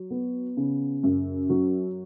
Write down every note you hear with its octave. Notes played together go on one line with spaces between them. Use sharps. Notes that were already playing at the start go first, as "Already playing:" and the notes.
Already playing: F#3
B3
C#3
F#2
F#3